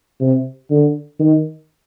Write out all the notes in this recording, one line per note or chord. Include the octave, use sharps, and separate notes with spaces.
C3
D3
D#3